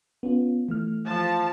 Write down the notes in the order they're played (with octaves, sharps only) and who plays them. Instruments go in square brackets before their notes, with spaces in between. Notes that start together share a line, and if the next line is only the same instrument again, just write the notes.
[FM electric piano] B3 C#4 F4
E3 A3 F6
[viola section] F3 A5